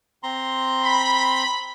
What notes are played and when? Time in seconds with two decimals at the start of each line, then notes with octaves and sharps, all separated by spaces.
0.23 C4 A#5 C6
0.83 B5